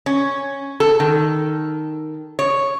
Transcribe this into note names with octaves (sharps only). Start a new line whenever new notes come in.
C#4
A4
D#3
C#5